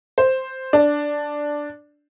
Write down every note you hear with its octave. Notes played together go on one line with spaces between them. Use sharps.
C5
D4